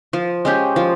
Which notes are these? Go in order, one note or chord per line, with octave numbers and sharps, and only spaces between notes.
F3
G#3 C#4 G4
F3